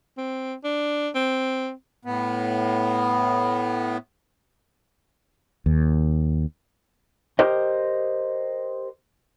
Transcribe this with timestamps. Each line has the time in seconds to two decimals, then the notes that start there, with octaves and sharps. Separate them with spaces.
0.17 C4
0.64 D4
1.15 C4
2.05 A2 B3
5.66 D#2
7.39 G4 A#4 C5 D#5